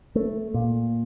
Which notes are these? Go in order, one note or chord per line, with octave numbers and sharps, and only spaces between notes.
A3
A#2